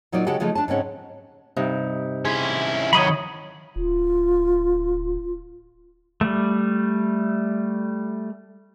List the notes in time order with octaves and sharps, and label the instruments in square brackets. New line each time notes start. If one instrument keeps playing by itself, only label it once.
[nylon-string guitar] A#2 F#3 D#4 F4 D5
C#3 G#3 F#4 G4 A4 F#5
C#3 F3 G#3 A3 D#4
D4 A5
G#2 C#3 C4 C#4 F#5
[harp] G2 C3 D#4
[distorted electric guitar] C#4 E4 [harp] G#4 C6
[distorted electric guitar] D#3 F#3 [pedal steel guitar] C#5 D#5 B5
[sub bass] D1 [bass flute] F4
[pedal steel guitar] G3 A3